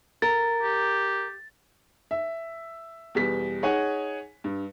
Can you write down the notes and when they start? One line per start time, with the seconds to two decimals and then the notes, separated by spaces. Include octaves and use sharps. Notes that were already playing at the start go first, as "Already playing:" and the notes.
0.22 A#4 A6
0.63 G4
2.11 E5
3.15 E2 B2 G3 B6
3.63 D#4 G#4 C#5 F#5 G#5
4.44 G2